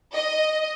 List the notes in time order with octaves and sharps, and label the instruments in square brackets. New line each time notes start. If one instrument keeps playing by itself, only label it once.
[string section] D#5